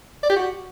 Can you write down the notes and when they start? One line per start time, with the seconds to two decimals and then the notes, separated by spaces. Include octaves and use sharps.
0.23 D5
0.30 G4
0.37 F#4